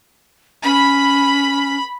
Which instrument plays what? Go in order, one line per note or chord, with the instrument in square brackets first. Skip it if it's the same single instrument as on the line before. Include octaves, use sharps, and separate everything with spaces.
[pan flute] C#4 [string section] B5